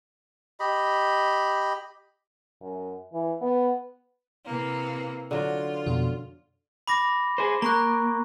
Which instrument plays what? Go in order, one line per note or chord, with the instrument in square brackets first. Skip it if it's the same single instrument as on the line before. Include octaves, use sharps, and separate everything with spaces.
[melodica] G4 D#5 B5
[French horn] F#2
E3
B3
[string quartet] C3 E3 A#3
[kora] D3 F#3 [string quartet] F4
[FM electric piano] F2 B2 F#4
[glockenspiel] B5 D6 A#6
[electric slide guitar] G#4 C5
[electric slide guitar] A#3 [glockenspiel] A#5 C#6 F#6